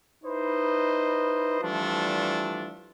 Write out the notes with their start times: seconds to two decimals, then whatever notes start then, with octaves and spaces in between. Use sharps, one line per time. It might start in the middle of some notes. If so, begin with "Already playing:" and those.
0.23 D#4 E4 B4 C5 D#5
1.61 E3 F3 G3 A3 D4